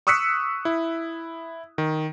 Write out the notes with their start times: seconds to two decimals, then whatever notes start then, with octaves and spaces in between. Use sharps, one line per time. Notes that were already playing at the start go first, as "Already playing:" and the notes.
0.07 C#6 D#6 E6 F#6 B6 C#7
0.65 E4
1.78 D#3